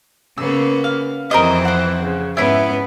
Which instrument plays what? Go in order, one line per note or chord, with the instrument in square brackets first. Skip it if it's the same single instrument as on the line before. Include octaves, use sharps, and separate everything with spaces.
[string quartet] C#3 A#3 B3 [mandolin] E6
[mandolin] F5
[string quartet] F2 E3 C4 [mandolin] A#4 C5 D#5
[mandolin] C5 F#5
[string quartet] C#3
[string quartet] G#2 B3 C#4 [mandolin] E4 B4